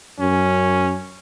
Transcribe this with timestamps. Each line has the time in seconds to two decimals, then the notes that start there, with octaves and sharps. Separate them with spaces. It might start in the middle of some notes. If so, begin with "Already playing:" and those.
0.20 F#2 C#4